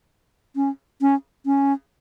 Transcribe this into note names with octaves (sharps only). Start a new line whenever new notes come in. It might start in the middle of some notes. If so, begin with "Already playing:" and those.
C#4
C#4
C#4